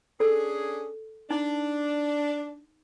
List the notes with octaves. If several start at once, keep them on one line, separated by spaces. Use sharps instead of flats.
C#4 D4 G#4 A4
D4 D#4